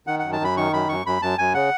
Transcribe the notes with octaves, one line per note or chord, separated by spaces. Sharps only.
D#3 F#5
F#2 F#5
A5
F#2 B5
D#3 C#6
F#2 B5
F#2 C#6
F#2 B5
F#2 A5
F#2 G#5
C#3 F#5